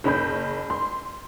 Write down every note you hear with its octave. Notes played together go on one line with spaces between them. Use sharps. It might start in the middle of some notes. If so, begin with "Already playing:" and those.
F#1 C#4 B5 G6
C6